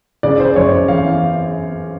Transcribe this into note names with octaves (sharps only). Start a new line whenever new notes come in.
C#3 D5
C5
C5
F#2 C#5
C5
E3 F5